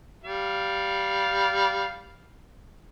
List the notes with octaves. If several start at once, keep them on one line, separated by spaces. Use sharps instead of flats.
G3 F5